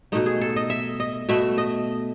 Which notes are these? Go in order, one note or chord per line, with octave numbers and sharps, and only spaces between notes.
B2 A3 D#4
G#4
A4
D#5
E5
D#5
B2 A3 E5
D#5